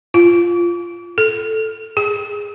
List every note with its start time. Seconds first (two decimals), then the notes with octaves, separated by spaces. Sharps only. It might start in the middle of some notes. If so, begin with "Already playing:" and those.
0.14 F4
1.18 A4
1.97 G#4